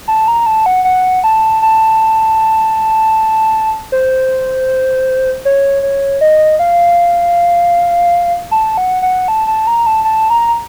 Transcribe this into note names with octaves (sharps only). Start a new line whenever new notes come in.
A5
A#5
A5
F#5
F#5
A5
A5
C5
C#5
C#5
D#5
F5
A5
F#5
F#5
A5
A5
A#5
A5
A5
A#5